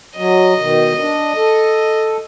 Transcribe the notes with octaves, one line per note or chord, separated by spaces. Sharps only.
F#3 D#5
B2 D#3
D4
A4